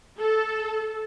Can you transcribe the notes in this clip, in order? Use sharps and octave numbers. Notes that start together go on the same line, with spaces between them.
A4